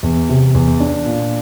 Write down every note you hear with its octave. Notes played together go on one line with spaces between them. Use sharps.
E2
C3
E2
D4
A#2